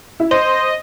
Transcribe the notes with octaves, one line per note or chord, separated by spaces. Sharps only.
E4
C5 D#5